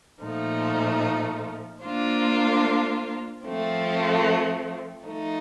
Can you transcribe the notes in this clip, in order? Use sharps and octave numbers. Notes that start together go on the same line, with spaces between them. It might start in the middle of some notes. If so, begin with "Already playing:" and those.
A#2 F3 A3 D#4
A#3 D4 F4 C5
F3 A3 C4
F3 A3 D#4